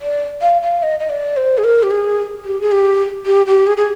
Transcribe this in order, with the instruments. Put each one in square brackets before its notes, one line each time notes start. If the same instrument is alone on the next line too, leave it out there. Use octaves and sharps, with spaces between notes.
[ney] D5
F5
F5
D#5
D#5
D5
C5
G#4
A#4
G4
G#4
G4
G#4
G4
G4
G4
G#4
G#4